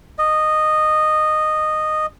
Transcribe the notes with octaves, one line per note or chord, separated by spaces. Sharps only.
D#5